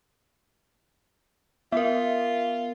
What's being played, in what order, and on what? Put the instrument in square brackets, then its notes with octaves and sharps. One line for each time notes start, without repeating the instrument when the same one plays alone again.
[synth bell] B3 A#4 [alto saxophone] F4 [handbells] E5